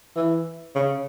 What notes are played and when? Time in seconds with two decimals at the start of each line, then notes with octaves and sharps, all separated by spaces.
0.17 E3
0.75 C#3